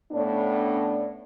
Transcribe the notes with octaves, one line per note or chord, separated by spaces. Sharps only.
A2 B3 C#4 D4